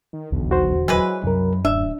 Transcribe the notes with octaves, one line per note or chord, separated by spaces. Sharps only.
D#3
D#1 B1 E2 D3
F#4 C5
E3 F#3 G#3 B4
C2 F#2 A#4
D1 D4 E5